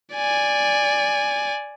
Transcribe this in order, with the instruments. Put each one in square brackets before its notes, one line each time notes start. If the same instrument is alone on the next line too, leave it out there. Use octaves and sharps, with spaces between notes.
[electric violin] D5 G#5